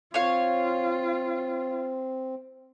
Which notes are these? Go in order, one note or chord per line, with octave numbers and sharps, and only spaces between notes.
C4 F4 C#5 F5